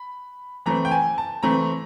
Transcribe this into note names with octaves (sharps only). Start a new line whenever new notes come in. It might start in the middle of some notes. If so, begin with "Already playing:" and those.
Already playing: B5
E3 A3 C4 A#5
G5
G#5
A5
E3 A3 C4 A#5